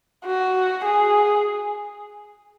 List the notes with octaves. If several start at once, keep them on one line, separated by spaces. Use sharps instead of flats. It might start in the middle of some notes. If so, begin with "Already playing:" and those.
F#4
G#4